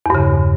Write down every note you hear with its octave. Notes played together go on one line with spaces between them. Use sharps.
E2 G2 C#3